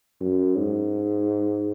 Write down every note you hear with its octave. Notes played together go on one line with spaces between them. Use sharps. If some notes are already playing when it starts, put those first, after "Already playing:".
F#2
G#2